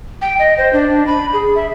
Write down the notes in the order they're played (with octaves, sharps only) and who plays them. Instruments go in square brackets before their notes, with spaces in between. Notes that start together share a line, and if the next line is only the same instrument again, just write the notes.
[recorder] G5
D#5
C5
D4
B5
G#4
E5